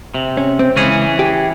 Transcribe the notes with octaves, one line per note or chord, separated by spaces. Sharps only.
C3
C#4
C4
C#2 E3 C#4 G#4
G4